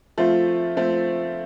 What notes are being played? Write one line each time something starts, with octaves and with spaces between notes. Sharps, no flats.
F3 A3 C4 F4
F3 A3 C4 F4